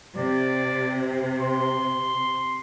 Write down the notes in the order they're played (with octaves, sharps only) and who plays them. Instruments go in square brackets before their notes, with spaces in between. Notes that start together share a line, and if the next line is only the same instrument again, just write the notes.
[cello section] C3 [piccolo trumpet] D5
[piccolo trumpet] C6